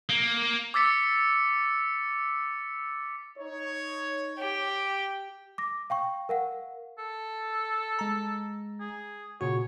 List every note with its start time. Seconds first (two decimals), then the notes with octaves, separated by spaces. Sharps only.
0.09 A#3
0.74 D6 E6 A6 B6 C#7
3.39 D#4 C#5
4.39 G4
5.58 D6 A#6
5.90 F5 G5 C#6
6.29 A#4 F5 F#5
6.99 A4
7.99 G#3 A#5
8.80 G#4
9.41 A#2 C#3 F#4 C#5